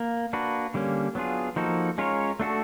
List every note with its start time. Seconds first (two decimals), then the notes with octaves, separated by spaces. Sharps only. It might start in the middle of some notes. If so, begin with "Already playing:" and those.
Already playing: A#3
0.33 A#3 D4 F#4 B4
0.74 D3 G3 A#3 C#4
1.15 F#3 B3 D4 F4 G#4
1.56 F3 A#3 D#4 F#4 A4
1.98 G#3 C#4 F4 A#4 C#5
2.40 A3 D4 F#4 A4